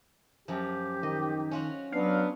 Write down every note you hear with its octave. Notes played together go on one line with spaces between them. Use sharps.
F#2 F3 G4
D#3 D#5
C#4 F4 F#4
F#3 B3 D4 F5